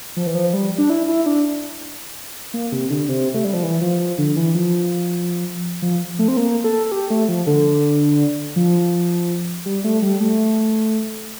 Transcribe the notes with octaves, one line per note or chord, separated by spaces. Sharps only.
F3
E3
F3
G3
D4
E4
E4
D4
A#3
C3
D3
C3
A3
G3
F3
E3
F3
F3
D3
E3
F3
F3
A3
C4
A#3
A4
A4
G4
A3
F3
D3
F3
G3
A3
G3
A3